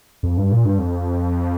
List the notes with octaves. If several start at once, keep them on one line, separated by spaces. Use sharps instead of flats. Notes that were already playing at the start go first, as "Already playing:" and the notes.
F2
G2
A#2
G2
F2